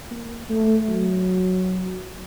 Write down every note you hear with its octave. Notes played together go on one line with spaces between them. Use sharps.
A#3
A3
F#3